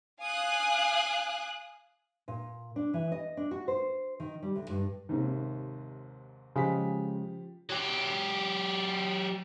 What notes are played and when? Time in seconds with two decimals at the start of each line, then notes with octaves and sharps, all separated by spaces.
0.22 F5 G#5 D#6 F#6
2.28 A#2
2.76 D4
2.94 E3
3.12 D#5
3.37 D4
3.51 F#4
3.68 C5
4.20 D#3
4.43 G3
4.56 D2
4.70 G2
5.09 D#2 G#2 C3
6.56 C#3 F3 G#3 G4 B6
7.70 F#3 G4